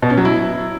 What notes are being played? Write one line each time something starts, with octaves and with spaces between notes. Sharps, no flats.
B2
C#4
F#3
E4